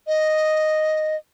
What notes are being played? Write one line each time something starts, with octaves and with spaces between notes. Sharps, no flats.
D#5